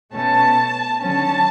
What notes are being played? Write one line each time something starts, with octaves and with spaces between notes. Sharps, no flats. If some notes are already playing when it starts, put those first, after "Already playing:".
B2 A3 C#4 A5
D3 F#3 C#4 A5